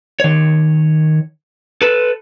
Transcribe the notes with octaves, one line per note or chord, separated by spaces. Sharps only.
D#3 C#5
A4 B4